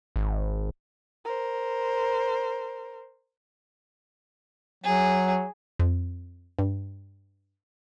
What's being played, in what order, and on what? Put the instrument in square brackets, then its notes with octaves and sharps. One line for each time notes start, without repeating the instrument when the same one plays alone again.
[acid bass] G#1
[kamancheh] A#4 C5
[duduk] F#3 [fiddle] G#4
[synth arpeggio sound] F2
G2